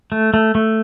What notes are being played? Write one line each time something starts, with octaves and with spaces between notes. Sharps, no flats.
A3
A3
A3